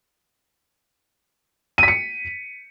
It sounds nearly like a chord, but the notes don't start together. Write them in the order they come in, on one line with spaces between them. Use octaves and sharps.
D#7 B6 C#7